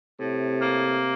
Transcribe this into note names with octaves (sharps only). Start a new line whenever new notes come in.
A2 C3
A#3